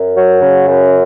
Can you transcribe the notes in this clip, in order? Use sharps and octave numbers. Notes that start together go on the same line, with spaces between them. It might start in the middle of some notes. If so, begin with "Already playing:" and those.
Already playing: F#2
F#3
C#3
F#2